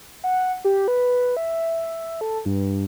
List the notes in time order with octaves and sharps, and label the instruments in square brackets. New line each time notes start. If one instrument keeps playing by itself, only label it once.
[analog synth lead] F#5
G4
B4
E5
A4
G2